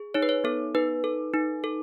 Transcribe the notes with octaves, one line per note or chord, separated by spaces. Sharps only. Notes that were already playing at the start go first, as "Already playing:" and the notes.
Already playing: G#4
D#4 C#5
B4
C#5
B3 A4
D#4 B4
A4
D#4
A4